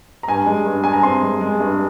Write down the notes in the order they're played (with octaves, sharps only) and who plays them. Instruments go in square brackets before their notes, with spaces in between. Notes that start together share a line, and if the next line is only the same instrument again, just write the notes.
[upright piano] A#5
G2 G#5
G#3
G2
G2 G#5
A#5
C4 C6
G#3
G#3
G2